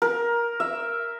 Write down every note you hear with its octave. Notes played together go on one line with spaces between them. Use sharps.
A#4
E5